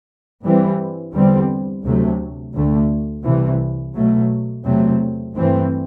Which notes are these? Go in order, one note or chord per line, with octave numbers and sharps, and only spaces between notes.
G2 E3 G3 C4
E2 D3 G3 C4
D2 C3 F#3 A3
D2 D3 A3
C2 C3 E3
B2 F#3 A3
E2 C3 F#3 A3 C4
G2 E3 A3 C4